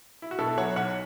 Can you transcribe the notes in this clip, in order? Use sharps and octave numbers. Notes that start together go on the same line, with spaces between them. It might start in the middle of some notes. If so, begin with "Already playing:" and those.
E4
F#4
B2 E4 A4
F#3 C#5 F#5
B1 C#5 F#5